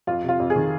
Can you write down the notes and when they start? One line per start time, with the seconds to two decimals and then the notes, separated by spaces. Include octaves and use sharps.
0.07 F2 F4
0.23 C3
0.29 F4
0.40 F2
0.50 G#4
0.56 D#3